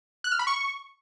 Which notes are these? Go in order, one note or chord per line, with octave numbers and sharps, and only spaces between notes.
F#6
F6
B5
C#6